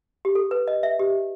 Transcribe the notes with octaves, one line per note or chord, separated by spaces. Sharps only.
G4
A4
B4
D#5
E5
G4